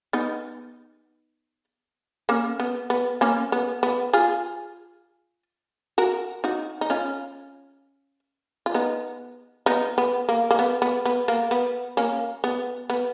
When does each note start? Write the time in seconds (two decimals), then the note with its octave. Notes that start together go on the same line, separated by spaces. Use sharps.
0.13 B3 D#4
2.29 A#3 C#4
2.60 B3
2.90 B3
3.21 A#3 C#4
3.52 B3
3.83 B3
4.13 F4 G#4
5.98 F#4 A#4
6.44 D#4 F#4
6.81 D#4
6.90 C#4 F4
8.66 F4
8.74 B3 D#4
9.66 B3 D#4
9.98 B3
10.29 A#3
10.51 A#3
10.59 B3
10.82 B3
11.06 B3
11.28 A#3
11.51 B3
11.97 A#3 C#4
12.44 B3
12.90 B3